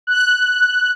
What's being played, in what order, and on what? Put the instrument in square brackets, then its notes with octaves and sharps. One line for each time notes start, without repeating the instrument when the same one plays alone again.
[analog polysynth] F#6